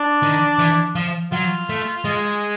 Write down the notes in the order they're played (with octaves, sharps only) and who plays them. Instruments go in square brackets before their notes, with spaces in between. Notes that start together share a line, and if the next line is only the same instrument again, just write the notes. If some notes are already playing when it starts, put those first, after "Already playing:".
Already playing: [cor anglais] D4
[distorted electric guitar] D#3
E3
F3
[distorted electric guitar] F#3 [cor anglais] F4
[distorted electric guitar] A3
G#3